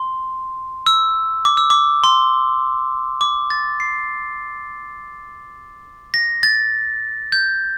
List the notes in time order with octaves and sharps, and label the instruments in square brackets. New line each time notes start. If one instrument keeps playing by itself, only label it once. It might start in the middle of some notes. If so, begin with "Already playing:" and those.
Already playing: [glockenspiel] C6
E6
D6
E6
D6
C6
D6
A6
C7
A#6
A6
G6